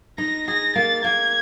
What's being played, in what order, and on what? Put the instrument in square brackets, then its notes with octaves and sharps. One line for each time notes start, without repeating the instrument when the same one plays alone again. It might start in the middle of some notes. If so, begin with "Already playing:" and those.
[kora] D#4 [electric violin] A#6
[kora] G#4 [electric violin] A#6
[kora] A#3 [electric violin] A6
[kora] A#3 [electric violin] G#6